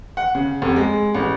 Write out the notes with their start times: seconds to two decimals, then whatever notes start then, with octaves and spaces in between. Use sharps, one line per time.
0.17 F#5
0.35 C#3
0.62 F1
0.76 G#3
1.14 A1